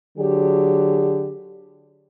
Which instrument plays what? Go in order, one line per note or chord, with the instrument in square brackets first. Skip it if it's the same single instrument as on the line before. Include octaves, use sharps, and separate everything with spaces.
[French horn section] D3 F#3 G4 G#4